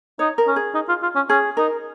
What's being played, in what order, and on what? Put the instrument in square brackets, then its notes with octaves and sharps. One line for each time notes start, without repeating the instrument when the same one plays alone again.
[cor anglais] D#4 [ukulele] C#5
[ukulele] A#4
[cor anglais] C#4
[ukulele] G#4
[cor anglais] D#4
F4
F4
C#4
[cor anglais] C#4 [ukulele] G#4
[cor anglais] D#4 [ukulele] A#4